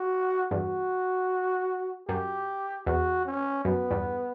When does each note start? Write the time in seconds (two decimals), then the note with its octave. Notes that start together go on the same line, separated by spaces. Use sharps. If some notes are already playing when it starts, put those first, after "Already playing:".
Already playing: F#4
0.51 E2 G2 F#4
2.08 F#2 G4
2.86 E2 F#4
3.26 C#4
3.65 F#2 B3
3.91 E2 G2